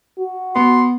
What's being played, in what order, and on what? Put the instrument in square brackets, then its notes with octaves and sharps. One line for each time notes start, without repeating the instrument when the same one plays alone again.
[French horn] F#4
[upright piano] B3 [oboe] C6